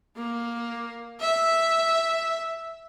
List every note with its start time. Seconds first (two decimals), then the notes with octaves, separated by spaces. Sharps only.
0.17 A#3
1.21 E5